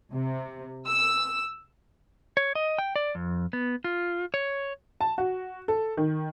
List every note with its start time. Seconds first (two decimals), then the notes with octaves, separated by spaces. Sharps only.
0.12 C3
0.87 E6
2.37 C#5
2.55 D#5
2.78 G5
2.96 D5
3.15 F2
3.53 B3
3.84 F4
4.34 C#5
5.01 A5
5.18 F#4
5.68 A4
5.97 D#3